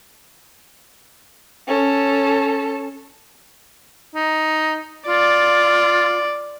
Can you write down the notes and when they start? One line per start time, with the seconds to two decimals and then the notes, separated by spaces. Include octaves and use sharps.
1.67 C#4 A4
4.15 D#4
5.08 F4 D5